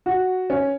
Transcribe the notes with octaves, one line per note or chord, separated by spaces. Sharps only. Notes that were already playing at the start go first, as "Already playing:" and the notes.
F#4
C#4